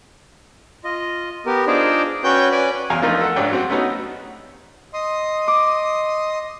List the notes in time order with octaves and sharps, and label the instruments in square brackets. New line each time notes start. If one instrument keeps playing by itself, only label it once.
[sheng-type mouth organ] F4 D#5
B3 G4 A#4
D4 D#4 F4 G#4 C5 D5
C#4 F#4 B4 C#5 G5 G6
C#4 B4 D5 G#5 B5
[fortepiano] B1 E2 F5 G#5 A#5
F3 A3 A#3 D4 D#4 F4
A4 F#5
A#1 G#2 D4 C#5 G5
F#3 C4 F#4
A3 B3 C#4 D#4 F#4
[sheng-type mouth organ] D#5 C6 D#6
[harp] D6